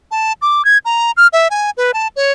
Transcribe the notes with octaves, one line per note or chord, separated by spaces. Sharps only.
A5
D6
G#6
A#5
F6
E5
G#5
B4
A5
C#5